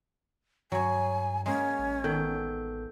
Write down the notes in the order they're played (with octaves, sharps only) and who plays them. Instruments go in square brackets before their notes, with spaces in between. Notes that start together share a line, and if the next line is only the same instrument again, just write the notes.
[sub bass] G2 [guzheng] F#3 C#5 [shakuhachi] G#5
[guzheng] G#3 A#3 [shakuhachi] C#4
[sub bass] A1
[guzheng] D#3 [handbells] B3 A4 G6